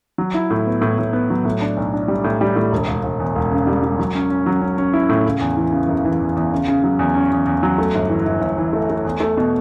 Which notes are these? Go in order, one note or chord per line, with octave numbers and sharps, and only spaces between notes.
F#3
E4
A2
B3
A2
A2
B3
F#3
A2
D4
B1
D4
G3
A2
G3
A2
E1
E1
E1
E2
E1
C#3
G3
G3
F#3
C#4
C#4
F#3
C#4
C#4
E4
A2
C#3
E2
E3
C#3
F#1
E3
E2
E2
C#3
C#3
F#3
E2
C#4
E2
E2
F#3
A3
G1
E3
G1
G1
E3
A3
A3
E2
A3
B2